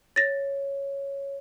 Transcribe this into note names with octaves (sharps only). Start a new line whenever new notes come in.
C#5 A6 A#6